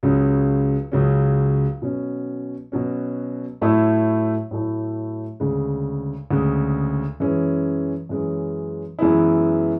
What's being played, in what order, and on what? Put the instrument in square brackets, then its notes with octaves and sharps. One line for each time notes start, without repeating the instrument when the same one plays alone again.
[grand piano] C#2 C#3 F#3 C#4
C#2 C#3 F#3 C#4
B2 F#3 C#4
B2 F#3 C#4
A2 F#3 A3 E4
A2 F#3 A3 E4
D2 C#3 G#3
D2 C#3 G#3
F#2 E3 G#3 C#4
F#2 E3 G#3 C#4
F#2 E3 G#3 B3 E4